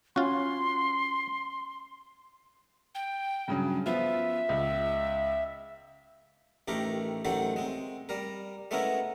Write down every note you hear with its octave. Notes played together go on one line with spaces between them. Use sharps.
C#4 F4 F#4 C6
G5
G2 C#3 F#3
F3 B3 F4 E5
C#2
A1 D#3 A3 G4 A#4
A1 D#3 F#3 A3 A4 C5
G#3 C4
G3 A#4
G#3 A3 B3 C#4 E4 A#4